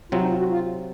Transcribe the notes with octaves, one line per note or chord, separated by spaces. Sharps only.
C3 F#3 C4 F4
D#4
F4
F#4
F4